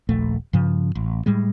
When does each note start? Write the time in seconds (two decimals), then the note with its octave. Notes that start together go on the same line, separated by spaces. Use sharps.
0.09 D#1 A#1 A3
0.53 G2 C#3 F3
0.95 A1
1.26 A2 G3 G#3